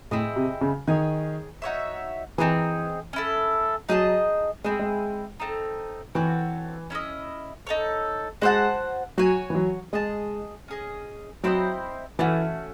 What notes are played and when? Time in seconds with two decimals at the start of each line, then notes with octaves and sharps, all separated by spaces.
0.11 A2 C4 E4 G#4 D#5
0.36 C3
0.61 C#3
0.87 D#3 G#4 C#5 G#5
1.62 D#4 F#4 C#5 E5
2.38 E3 C4 D#4 G#4
3.13 C#4 E4 A4
3.89 F#3 D#4 G#4 D#5 A5
4.64 G#3 C4 E4 G#4
4.79 G#3
5.40 A3 C4 D#4
6.15 E3 C4 F#4 A4 C#5
6.90 C#4 E4 A4 D#5
7.67 D#4 A4 C#5
8.42 G#3 F#4 C5 F#5 A5
9.18 F#3 F#4 C#5 G#5
9.50 E3
9.55 F#3
9.93 G#3 G#4 D#5 A5
10.68 C#4 G#4 D#5
11.43 F#3 C4 E4 C5 D#5
12.19 E3 A3 C#4 F#4